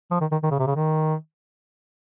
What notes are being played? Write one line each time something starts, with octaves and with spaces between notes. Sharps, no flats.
F3
D#3
D#3
D#3
C#3
C3
C#3
D#3